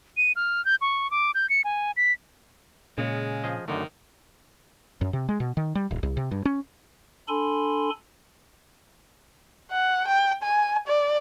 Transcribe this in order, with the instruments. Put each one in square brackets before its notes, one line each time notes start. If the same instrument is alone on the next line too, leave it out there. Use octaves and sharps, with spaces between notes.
[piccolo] D#7
F6
G6
C#6
D6
G6
C#7
G#5
B6
[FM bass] A#2 [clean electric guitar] C#3 [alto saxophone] G#3
[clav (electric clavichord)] F3 G#4 D#5
[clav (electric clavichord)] F#2 D3 A3 [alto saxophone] D#3
[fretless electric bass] F#2
C3
G#3
B2
D#3
G3
D1
C2
C3
G2
C#4
[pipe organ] D4 A4 G#5 B5 C6
[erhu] F#5
G5
G#5
D5